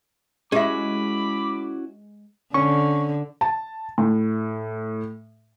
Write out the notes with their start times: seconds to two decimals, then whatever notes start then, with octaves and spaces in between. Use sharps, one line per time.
0.52 G#3 C#4 E4 F#4 G4 E5 B5 D6
2.54 D3 C#4 C#6
3.41 A5
3.98 A2